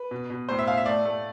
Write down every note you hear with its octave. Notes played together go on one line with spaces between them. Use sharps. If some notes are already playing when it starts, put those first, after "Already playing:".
Already playing: B4
B2
B2
A2 C5
E5
A2 F5
E5
A3 D5
A3